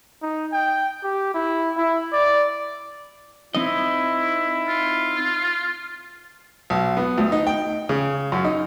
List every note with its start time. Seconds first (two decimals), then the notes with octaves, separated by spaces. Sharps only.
0.22 D#4
0.52 G5
1.04 G4
1.34 E4
1.77 E4
2.13 D5
3.55 C4 D#4 E4 D#5
4.68 F4
6.70 B1
6.97 B3
7.18 D2
7.32 D#4
7.47 G5
7.89 C#3
8.32 F#2
8.44 D#4